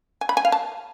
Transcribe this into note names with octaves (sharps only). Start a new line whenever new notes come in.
G#5
B5
G#5
F5
A5